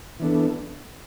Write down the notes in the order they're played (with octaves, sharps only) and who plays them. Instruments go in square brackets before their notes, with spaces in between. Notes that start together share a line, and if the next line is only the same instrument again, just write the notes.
[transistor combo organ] E3 B3 D4 A4